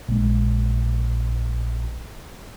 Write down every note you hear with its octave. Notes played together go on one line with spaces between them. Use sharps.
A#1 G#3